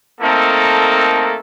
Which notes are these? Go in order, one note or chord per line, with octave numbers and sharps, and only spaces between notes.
A3 A#3 C4 D#4 A4 A#4